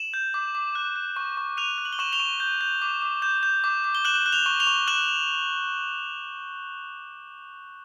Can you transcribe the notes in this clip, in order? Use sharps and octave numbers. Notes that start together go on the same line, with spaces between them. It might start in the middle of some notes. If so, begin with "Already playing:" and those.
Already playing: E7 F#7
G6
D6
D6
F#6
F#6
C#6
C#6
F#6 D#7 F7
F#6
F#7
G7
C#6 E7 F#7
F7 G7
C#6
G6
G6
D6
D6
G6
G6
D6
D6
G7
F#6 E7 F#7
F#6
F7 G7
C#6
F7 G7
C#6
F#6 E7 F#7